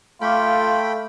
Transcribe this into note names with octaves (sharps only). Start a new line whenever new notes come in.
A3 F4 F5 G5 B5 C#6 D6